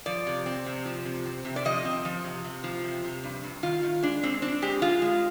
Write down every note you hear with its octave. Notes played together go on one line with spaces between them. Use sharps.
F3 D5
C3
C4
C3
F3
C3
C4
C3
D5
F3 D#5
C4
F3
C3
C3
F3
C3
C3
G2
G2
D#3 F4
D#3
G#3 D4
G#3 C4
C4 D4
G#3 G4
G#3 F4
G#3